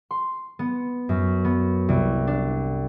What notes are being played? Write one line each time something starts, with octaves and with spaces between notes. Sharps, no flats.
C6
B3
F#2
B3
C2
D4